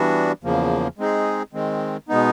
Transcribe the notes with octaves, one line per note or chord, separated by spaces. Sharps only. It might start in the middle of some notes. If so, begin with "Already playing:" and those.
Already playing: E3 G3 B3 D4 F#4
E2 C#3 F3 A#3
G#3 C4 D#4 G#4
D#3 G#3 C4
B2 G#3 B3 D#4